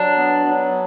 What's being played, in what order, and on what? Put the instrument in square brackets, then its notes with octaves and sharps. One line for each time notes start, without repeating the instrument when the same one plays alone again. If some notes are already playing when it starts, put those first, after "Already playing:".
Already playing: [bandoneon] F#3 [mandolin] D4
[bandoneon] B3
F#3